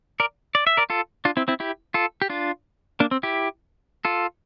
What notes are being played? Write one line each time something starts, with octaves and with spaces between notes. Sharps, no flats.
A#4 D5
D5
E5
A#4 D5
F4 A4
D4 F4
C4 E4
C4 E4
E4 G4
F4 A4
G4
D4 F4
A#3 D4
C4
E4 G4
F4 A4